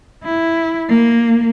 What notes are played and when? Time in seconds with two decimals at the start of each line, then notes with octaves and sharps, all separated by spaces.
0.24 E4
0.89 A#3